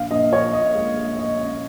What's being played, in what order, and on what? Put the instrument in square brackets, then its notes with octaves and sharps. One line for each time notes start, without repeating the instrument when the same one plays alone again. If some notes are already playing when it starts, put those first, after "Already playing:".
Already playing: [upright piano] A#1 F5
A#1 D#5
A#1 C#5
A#2 D#5
G#3 D#5
G#3
G#3 D#5
C#4